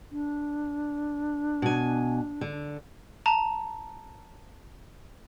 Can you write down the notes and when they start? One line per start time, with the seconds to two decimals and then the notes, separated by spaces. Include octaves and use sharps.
0.11 D4
1.62 B2 G#5
2.41 D3
3.26 A5 A#5